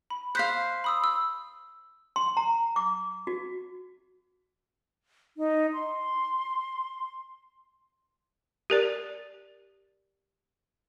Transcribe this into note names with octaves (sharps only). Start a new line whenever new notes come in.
B5
C5 F5 F#6 B6
B5 D#6 E6
E6
C6
A#5
D6
F#4
D#4
C6
G4 A#4 D5